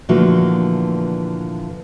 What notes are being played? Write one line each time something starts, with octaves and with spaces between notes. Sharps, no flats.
A#2 D3 E3 F3 A3 F#4